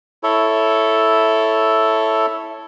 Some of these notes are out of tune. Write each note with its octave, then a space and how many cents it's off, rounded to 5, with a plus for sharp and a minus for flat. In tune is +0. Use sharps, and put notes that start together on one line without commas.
E4 +0 A4 +0 C#5 +0